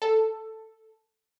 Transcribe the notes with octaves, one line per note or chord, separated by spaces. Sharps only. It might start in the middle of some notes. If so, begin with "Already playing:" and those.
A4